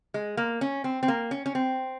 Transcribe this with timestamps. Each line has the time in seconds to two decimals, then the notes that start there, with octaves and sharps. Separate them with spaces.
0.14 G#3
0.37 A#3
0.61 C#4
0.84 C4
1.03 C4
1.08 A#3
1.31 C#4
1.46 C#4
1.55 C4